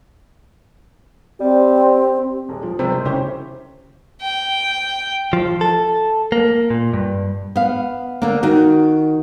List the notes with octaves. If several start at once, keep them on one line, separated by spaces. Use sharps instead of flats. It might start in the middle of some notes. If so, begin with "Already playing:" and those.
G3 C4 G4
D#1 G#3
F3
C3 G3 G#3 C5
F#1
C#3 C#4 E4 G4 C5
G5
F3
A4
A#3
A#2
G2
B3 F5
D3 A#3
D#3 F#4